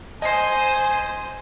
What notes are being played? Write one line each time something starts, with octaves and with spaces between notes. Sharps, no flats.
C5 D#5 G#5 C7